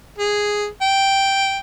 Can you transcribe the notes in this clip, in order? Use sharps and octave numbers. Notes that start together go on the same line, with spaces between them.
G#4
G5